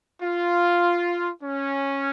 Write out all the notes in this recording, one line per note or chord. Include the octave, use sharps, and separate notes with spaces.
F4
C#4